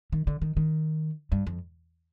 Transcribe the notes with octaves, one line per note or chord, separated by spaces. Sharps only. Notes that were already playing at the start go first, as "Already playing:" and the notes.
D#3
D3
D#3
D#3
G2
F2